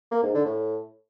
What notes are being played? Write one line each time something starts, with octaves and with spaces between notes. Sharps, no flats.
A#3
G#2
D3
A2